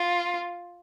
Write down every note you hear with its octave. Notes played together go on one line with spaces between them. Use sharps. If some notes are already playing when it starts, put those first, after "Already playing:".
Already playing: F4